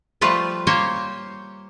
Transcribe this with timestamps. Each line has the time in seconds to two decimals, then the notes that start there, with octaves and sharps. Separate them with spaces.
0.21 F3 G3 A3 F4 B4
0.67 A#3 G4 C5 C#5